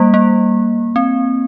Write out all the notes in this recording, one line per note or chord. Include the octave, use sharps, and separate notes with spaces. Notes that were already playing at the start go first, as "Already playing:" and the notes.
Already playing: G3 A#3
A#3
C4